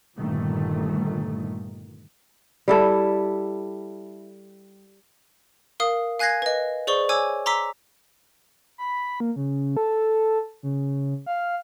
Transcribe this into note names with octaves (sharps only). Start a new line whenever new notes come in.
G1 A#2 D#3 A3
G3 E4 A4
A#4 F5 D#6
F5 G#5 F#6 G#6 A#6 C7
B4 D#5
G#4 C5 D5 C#6 G7
C#5 G#5 D6 E6
A#5 C6 D6 E6 B6
B5
A#3
C#3
A4
C#3
F5